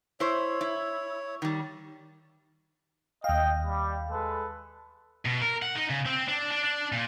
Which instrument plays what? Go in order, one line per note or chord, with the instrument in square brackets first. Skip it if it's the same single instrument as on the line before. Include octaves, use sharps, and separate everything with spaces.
[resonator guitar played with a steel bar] E4 C5 [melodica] C#5
[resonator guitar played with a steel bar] E4
D#3 G3
[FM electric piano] D#2 F5 [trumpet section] D#5 G5
[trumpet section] G3
G#3 A4 B4
[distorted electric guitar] B2
A#4
F#5
D#4
C#3
C4
D4
D4
D4
A#2